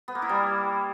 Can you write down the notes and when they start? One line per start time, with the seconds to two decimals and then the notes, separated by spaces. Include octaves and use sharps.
0.08 B3
0.15 A#3
0.22 E4
0.29 G3